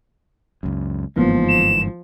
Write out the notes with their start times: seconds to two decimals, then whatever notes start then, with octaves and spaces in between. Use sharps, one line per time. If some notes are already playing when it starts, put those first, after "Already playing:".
0.63 C#2 F#2
1.16 G1 G#2 E3 F3 A#3 B3
1.49 E7